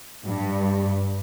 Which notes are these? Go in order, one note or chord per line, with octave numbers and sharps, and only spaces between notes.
G2